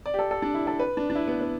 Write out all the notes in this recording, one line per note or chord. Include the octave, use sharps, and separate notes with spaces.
D5
G4
A4
A4
D4
E4
A4
B4
D4
D4
E4
B3
B3